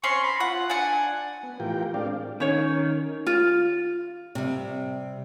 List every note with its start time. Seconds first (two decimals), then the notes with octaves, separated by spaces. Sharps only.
0.04 C4 C#4 C6 C#6
0.24 B5
0.40 F4 F#5
0.70 D4 F#5 G#5
1.43 B3
1.60 A2 E3 F4 G4 A#4 G5
1.94 G#3 C4 D4 D5 F5
2.40 D#3 C#4 C#5
3.27 F4
4.35 C3 G3